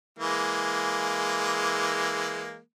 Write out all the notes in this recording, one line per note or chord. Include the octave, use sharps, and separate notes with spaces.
E3 G#3 A#3